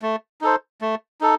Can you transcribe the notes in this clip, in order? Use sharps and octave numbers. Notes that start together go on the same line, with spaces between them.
A3
D#4 A4 C5
A3
D#4 A4